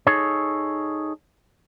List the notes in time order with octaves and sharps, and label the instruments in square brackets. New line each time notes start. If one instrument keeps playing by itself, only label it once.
[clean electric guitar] D#4 G#4 A4 C#5